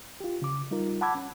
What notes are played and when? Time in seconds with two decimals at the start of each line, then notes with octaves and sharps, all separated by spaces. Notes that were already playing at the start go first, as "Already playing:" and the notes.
0.20 F4 G4
0.42 C#3 D6
0.71 G3 D#4 F4 A#4
1.01 F#5 A5 B5 D6 E6 G#6
1.15 C#4